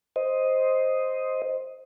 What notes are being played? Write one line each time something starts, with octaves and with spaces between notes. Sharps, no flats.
C5 D#5